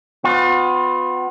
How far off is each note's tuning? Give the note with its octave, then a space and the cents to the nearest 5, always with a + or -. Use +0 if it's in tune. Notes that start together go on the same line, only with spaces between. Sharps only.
B3 +30 F4 +40